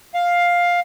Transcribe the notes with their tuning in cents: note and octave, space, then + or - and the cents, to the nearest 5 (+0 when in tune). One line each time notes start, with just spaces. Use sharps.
F5 +10